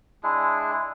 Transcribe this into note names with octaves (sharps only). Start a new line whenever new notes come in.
G#3 D4 E4 G#4